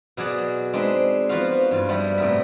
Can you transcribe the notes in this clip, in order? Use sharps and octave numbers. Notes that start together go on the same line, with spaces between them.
B2 F#3 G#4 D5 F#5
G#3 C4 D4 D#4 B4 E5
F3 B3 F4 F#4 F5
G2 F#3 F4
G3 B3 E4
A2 C3 B3 A#4 E5